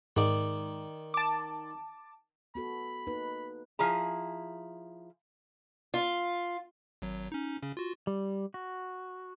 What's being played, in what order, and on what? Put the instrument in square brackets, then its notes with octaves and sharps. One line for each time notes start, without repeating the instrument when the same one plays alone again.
[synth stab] G#2 [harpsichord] D#3 D5
[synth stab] A5 D6
[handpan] B3 F#4 A4 [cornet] B5
[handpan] A#3 D#4 B4
[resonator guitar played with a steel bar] F3 E4 G#4 A#5
[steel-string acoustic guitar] F4
[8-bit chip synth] G#1 F#3
C#4 D#4
C#3 C#4
F4 F#4
[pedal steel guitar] G3
F#4